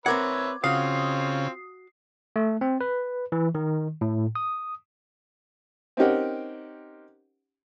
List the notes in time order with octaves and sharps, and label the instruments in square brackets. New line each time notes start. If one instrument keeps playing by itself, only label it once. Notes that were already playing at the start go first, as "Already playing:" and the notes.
[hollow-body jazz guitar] C4 A#4 F#5 [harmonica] B4 C#5 E5 [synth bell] D6 G#6
[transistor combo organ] C#3 [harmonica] C4 F4 [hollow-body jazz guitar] F#4 F5 [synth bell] D#6 C7
[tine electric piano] A3
C4
B4
E3
D#3
A2
D#6
[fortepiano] C4 C#4 D#4 G4 A#4 F#5